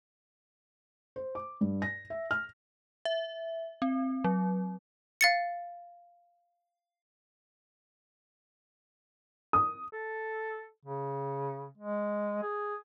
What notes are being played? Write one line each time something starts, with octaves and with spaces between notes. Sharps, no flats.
C5
D6
G2
A#6
E5
F6
E5
C4
F#3
F5 A6 C#7
D#6
A4
C#3
G#3
G#4